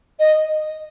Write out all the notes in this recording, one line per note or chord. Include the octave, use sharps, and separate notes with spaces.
D#5